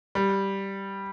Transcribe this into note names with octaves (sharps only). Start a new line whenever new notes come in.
G3